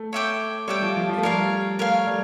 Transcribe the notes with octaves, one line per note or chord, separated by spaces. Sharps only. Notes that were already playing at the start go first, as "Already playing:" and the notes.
Already playing: A3
C#5 E5 G5 D6
G3 C#5 E5 G5 D6
F3
F3
F3
A3
G3 A#4 C#5 F5
A3 A#4 C#5 F5
G3